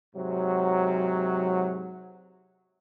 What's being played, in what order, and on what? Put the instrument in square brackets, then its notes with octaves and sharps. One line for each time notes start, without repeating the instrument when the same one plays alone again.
[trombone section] G#2 C3 F#3